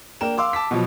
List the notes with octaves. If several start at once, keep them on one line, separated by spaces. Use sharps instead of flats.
A#3 D4 A#4 G5 E7
F5 C6 D6 E6
A5 D6 B6
B2 F3 F#3